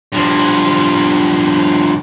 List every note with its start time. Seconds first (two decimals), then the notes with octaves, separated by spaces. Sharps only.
0.12 G2 F3